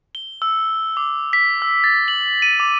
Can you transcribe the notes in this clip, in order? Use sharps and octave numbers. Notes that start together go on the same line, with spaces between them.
G7
E6
D6
B6
E6
A6
F#7
D#7
D6